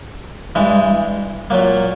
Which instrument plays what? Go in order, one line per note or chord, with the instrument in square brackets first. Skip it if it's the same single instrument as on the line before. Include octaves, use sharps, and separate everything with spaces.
[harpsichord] G2 E3 G#3
A#2 F#3 A#3